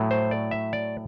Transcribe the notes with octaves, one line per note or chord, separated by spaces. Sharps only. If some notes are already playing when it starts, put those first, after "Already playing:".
Already playing: A2 F#3 A3
C5
D5
E5
D5